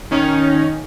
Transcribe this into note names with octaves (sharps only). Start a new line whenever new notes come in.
D#3 C#4 D#4